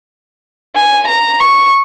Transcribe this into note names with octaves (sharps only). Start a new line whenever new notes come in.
G#5
A#5
C#6